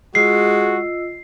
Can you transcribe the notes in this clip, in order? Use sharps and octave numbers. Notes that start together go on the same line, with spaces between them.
G#3 F4 F#4 D#5 E6 C7